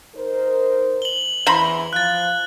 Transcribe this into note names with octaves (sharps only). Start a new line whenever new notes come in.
D#4 A#4 C5
F#7 G7
E2 E3 C5 A#5 B5
F3 F5 F#6 A6